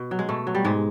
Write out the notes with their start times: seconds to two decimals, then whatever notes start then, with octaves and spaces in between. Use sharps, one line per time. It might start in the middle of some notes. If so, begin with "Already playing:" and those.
Already playing: B2
0.11 F#3
0.19 G#3
0.29 B2 A3
0.47 F#3
0.55 G3
0.65 G#2 G#3